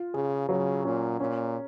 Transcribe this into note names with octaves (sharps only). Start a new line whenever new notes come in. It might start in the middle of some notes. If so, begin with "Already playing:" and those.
Already playing: F4
C#3 G#4
C#3 F#3
A#2 C#4
A#2 C#4